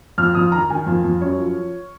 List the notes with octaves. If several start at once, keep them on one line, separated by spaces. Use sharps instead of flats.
F2 F6
F2 D#6
D#3 A#5
D#3 G#5
F2
F2
F#2 C#5
F3